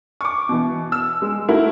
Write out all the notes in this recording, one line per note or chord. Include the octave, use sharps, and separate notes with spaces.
C#6 D6
B2 E3
E6
G#3
A3 E4 F#4 A#4